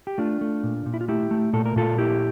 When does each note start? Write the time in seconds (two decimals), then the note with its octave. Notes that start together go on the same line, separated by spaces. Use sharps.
0.07 G4
0.18 A3 D4 F4
0.41 A3
0.64 A#2
0.86 A#2
0.94 E4
1.01 F4
1.08 A3 E4 G4
1.31 A3
1.53 A#2 A4
1.65 A#4
1.76 A#2 F4 A4
1.98 A#3 E4 G4